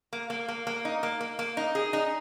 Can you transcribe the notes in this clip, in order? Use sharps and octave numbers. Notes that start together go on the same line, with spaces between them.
A#3
A#3
A#3
A#3
D#4
A#3
A#3
A#3
D#4
G#4
D#4